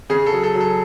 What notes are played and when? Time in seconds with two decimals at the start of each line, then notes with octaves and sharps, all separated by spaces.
0.10 C#3 G#4
0.26 A4
0.32 F#3
0.43 A4
0.55 F#3
0.60 A4